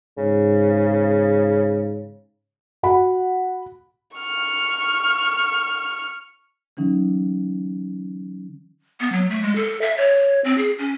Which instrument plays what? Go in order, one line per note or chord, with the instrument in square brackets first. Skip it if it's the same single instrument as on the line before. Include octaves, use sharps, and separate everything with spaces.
[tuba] G#2 [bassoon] C#3
[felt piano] F#4 F#5 B5
[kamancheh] C#6 F6
[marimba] D3 E3 F#3 C#4 D#4
[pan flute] B3
F#3
A3
G#3
A4
E5
C#5
C4
G#4
C#4